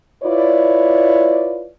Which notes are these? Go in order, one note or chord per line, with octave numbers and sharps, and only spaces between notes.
E4 F4 B4 C#5 D5